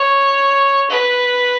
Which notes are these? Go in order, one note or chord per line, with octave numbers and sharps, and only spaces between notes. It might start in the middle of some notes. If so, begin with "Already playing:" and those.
Already playing: C#5
B4